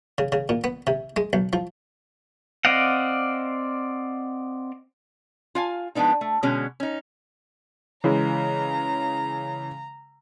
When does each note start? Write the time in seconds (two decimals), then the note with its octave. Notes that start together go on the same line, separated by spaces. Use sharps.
0.18 C#3
0.32 C#3
0.49 A#2
0.64 B3
0.87 C3
1.16 G#3
1.33 B1
1.53 F3
2.65 C4 D5 D#5 F5 F#5
5.55 F4 F5 G#5
5.95 F3 G#3 B3 D4 D#4
6.21 A3
6.43 B2 D3 G#3 C#4
6.80 C#4 D#4
8.04 C#3 E3 G#3 A#5